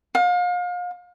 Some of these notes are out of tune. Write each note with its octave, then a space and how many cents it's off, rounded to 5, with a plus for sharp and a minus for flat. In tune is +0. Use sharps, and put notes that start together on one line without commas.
F5 +35